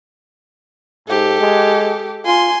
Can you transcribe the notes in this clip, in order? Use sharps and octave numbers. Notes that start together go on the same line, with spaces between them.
G#2 G4 A4
G#3
F4 G#5 C6